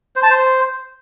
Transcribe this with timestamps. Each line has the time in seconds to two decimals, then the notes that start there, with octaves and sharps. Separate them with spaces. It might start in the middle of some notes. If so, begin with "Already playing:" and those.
0.16 C5
0.23 A5
0.30 C5